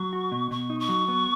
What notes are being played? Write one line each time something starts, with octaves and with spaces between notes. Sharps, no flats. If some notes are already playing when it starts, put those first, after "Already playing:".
Already playing: F#3 C#6
F#4
B2
B2 C#6
D#4
C#6
F#3
B3